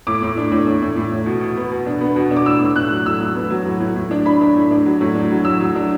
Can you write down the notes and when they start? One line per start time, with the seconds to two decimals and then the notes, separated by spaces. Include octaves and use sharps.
0.07 A2 D6
0.22 A2
0.37 D4
0.52 A2
0.67 A2
0.82 A2
0.96 A2
1.12 A2
1.26 B2
1.41 B2
1.56 B3
1.72 B2
1.86 D4
2.01 B3
2.16 B2
2.31 D4
2.36 D6
2.46 A2 E6
2.61 A2
2.76 A2 F#6
2.91 F#3
3.06 A2 E6
3.20 A2
3.35 B3
3.50 F#3
3.66 A2
3.80 A2
3.96 A2
4.11 D4
4.25 D4 B5
4.41 D4
4.56 A2
4.71 D4
4.86 F#3
5.01 A2
5.15 D4
5.30 F#3
5.45 A2 E6
5.60 F#3
5.75 D4